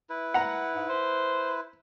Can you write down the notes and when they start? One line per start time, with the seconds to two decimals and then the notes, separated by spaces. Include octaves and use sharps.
0.10 E4 B4
0.34 F#5 A#5
0.75 G#2
0.89 C5